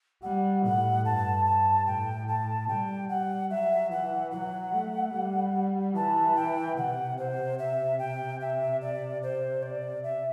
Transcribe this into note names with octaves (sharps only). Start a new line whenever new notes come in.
G3 F#5
A2 F#5
G2 A5
G2 A5
A2 G5
A5
G3 G5
G3 F#5
F#3 E5
E3 F#5
F#3 F#5
A3
G3
E3 A5
G5
C3 F#5
C5
E5
G5
E5
D5
C5
D5
E5